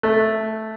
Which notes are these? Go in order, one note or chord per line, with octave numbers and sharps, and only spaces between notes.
A3